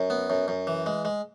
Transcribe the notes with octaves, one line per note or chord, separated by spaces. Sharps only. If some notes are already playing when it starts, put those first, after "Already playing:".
Already playing: F#2
B3
F#2
F#2
E3
G#3
G#3